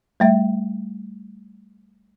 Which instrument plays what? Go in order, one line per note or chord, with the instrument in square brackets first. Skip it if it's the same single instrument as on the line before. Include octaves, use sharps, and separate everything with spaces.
[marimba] G3 A3 E5